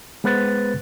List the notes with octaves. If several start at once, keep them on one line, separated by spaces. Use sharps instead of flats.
G#3 B3 B4 C5 F#6 A6